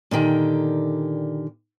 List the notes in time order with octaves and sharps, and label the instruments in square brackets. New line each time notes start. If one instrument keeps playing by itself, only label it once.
[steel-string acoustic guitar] A#2 D3 D#3 G4